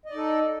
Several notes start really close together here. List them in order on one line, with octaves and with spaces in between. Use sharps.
D#5 D5 D#4 A4